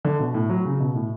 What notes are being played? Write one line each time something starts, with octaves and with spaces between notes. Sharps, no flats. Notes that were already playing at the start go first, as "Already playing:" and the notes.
D3
B2
A2
F#3
C#3
B2
A2